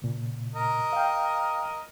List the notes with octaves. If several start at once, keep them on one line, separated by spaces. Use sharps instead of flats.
A#2 C#3
A#4 D#5
F5 G5